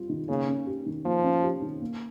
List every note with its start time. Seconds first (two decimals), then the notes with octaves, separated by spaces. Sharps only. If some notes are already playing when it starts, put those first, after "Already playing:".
Already playing: G3 C4 F4
0.09 D#3
0.29 C#3 A#3
0.47 C#4
0.67 G4
0.86 D#3
1.05 F3 A#3
1.24 C#4
1.43 G4
1.62 D#3
1.81 A#3